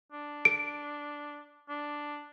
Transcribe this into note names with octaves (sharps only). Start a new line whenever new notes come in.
D4
D7
D4